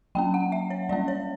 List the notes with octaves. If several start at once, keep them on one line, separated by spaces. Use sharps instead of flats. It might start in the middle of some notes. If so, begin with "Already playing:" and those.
F#3 A#3 C#4 G5
F#5
E5
C#5
G3 A#3 C#4 D5
C#5